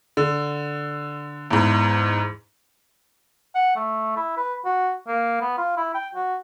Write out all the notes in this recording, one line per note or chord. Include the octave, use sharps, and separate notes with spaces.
D3
E2 G#2
F#5
A3
E4
B4
F#4
A#3
B3
F4
E4
G5
F#4